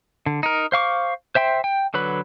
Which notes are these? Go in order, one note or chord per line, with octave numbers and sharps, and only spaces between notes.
D3
D#4 A#4
C5 F5 C#6 D6
C5 E5 G5 C6
G5
D3 F#3 B4 B5